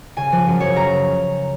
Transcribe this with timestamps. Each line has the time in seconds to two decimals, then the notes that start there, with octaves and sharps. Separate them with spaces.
0.17 C#3 G#5
0.32 F3
0.47 F#2
0.60 F#2 C#5
0.76 C#3 A#5